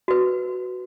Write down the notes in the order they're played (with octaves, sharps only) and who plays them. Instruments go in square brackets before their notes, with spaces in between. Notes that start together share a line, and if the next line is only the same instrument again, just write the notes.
[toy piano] F#4 B4